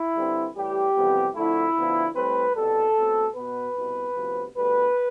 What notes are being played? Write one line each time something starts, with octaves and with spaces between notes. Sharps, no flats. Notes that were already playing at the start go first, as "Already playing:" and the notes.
Already playing: E4
G2 D3 G3 C4
A2 E3 G3 G4
F2 C3 E3 G3 B3
F2 D3 A3 E4
D2 D3 F3 B3
A2 G3 C4 B4
C2 B2 G3 A4
B2 A3 C4
B2 B3 B4
C2 B2 B3
D2 C3 F3 B3
D2 D3 G3 B3 B4